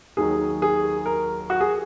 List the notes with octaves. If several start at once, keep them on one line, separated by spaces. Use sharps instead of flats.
D#2 D#3 F#3 G#4
G#4
A#4
F#4
G#4